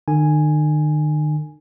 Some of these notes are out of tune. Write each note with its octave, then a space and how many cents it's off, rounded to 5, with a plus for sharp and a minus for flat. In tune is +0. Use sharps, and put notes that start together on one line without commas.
D#3 -45 G#5 +0